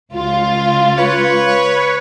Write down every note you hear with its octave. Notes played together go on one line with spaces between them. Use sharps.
C#2 F4
B4 C#5